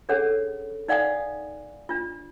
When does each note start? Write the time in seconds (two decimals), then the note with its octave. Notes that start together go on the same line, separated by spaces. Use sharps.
0.09 C#4 D4 G#4 A4 C#5 F#5
0.88 D#4 D5 F5 F#5 G#5 D#6
1.89 D4 F4